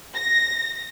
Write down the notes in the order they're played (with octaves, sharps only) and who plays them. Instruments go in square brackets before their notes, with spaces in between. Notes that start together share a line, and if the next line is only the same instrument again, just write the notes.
[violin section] A#6